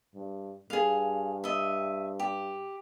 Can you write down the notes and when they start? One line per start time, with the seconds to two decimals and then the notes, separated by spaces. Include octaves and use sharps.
0.15 G2
0.70 G2 G#4 F5
1.44 D#5 E5
2.20 G4